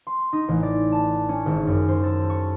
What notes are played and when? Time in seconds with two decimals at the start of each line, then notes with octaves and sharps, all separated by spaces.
0.07 C6
0.33 D#4
0.48 A1
0.63 D5
0.92 A5
1.29 C#4
1.46 G#1
1.67 F#2
1.88 C5
2.04 A4
2.30 C#6